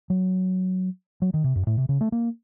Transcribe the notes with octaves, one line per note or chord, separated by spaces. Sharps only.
F#3
F#3
D#3
C3
F#2
A2
C3
C#3
A3
A#3